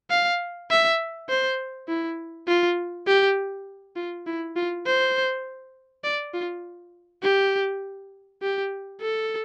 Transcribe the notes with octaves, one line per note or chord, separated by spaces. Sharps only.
F5
E5
C5
E4
F4
G4
F4
E4
F4
C5
D5
F4
G4
G4
A4